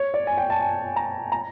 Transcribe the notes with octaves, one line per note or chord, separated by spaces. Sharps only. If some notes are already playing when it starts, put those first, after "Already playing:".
Already playing: C#5
D5
G#5
G5
A5
G#5
A#5
A#5